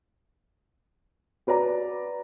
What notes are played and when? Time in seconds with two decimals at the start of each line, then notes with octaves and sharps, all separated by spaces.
1.47 F#4 B4 D5 A#5